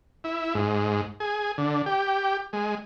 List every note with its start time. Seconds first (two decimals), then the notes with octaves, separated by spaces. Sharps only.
0.24 E4
0.55 G#2
1.20 G#4
1.58 D3
1.86 G4
2.53 G#3